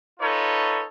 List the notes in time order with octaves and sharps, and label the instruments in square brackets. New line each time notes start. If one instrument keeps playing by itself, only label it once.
[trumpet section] D#4 F4 A4 B4 C#5